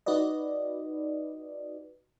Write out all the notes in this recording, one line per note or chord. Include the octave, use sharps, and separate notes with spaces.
D#4 F#4 B4 D5 D#5